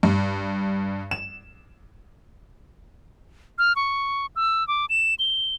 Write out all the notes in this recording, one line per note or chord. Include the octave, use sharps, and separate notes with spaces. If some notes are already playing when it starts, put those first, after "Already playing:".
G2
E7
F6
C#6
E6
D6
E7
G7